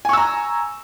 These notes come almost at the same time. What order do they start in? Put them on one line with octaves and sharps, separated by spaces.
G#5 C#6 E6 A#5